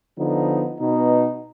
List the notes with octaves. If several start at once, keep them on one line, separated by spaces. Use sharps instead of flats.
D3 F3 B3 D#4
B2 B3 D#4